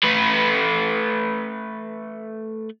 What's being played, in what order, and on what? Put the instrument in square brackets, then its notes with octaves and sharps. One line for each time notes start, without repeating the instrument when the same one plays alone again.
[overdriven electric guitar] A3 B4